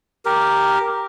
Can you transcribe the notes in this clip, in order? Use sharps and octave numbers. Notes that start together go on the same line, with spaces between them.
G4 A#4